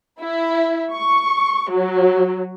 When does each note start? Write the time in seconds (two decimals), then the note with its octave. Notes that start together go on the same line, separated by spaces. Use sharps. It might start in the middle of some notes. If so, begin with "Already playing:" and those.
0.19 E4
0.91 C#6
1.70 F#3